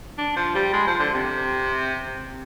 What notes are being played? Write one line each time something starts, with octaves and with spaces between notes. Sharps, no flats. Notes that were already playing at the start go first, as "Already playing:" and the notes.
D4
F3
G3
G#3
F3
D3
C3